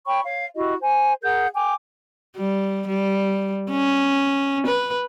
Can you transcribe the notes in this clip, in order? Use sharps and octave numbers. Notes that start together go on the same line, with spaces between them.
C#5 G5 B5 C#6
C#5 F5
E4 F#4 G4 D#5
C5 G#5
G#4 A#4 F#5 G6
G5 G#5 D6
G3
G3
C#4
B4